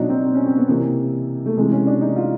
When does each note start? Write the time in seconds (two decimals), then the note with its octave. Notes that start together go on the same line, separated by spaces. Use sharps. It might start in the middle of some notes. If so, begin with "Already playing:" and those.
Already playing: B2 F#3 D4 D#4
0.09 C4
0.24 C4
0.35 C#4
0.46 C4
0.58 B3
0.68 C3 E3 A#3
1.46 A3
1.57 C3 E3 G#3
1.72 C#4
1.87 D4
2.01 D#4
2.16 F4